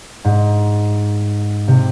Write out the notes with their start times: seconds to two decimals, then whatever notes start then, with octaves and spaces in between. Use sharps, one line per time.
0.24 G#2
1.68 C3